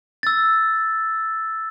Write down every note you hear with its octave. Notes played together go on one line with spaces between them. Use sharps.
E6 A6